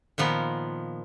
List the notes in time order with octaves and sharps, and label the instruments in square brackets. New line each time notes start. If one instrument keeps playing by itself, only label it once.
[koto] A#2 D#3 F3 B3